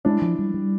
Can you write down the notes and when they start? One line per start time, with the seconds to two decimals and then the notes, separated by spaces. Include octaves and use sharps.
0.05 G#3 D4 E4
0.22 F3
0.39 G3
0.54 G3